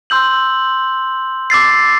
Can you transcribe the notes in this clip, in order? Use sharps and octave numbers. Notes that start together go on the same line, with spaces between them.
C6 E6 G6 F#7
D6 E6 A6 C7